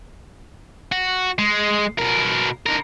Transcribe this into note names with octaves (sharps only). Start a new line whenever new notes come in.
F#4
G#3
B2 A#4
D3 A#4